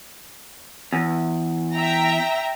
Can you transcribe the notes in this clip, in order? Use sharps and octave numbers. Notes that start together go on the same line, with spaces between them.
E2
E5 G5 A#5